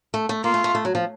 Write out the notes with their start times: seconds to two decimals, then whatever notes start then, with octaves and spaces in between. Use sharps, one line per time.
0.14 A3
0.29 A3
0.44 A#3 F4
0.54 A3
0.64 A3
0.75 A3
0.85 F#3
0.95 F3